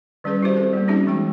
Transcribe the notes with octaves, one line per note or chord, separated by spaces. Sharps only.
D#3 G3 C#4 G#4 B4
E4 F#4 G4 C5 E5
C4 A4
G3 A#3 B3
C4 C#4 D#4 F#4 G#4 E5
E3 G#3 G5